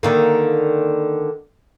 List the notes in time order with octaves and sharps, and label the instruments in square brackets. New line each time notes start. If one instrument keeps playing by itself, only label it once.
[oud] D3 D#3 A#3